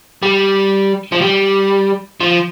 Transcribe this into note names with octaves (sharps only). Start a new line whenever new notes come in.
G3
F3
G3
F3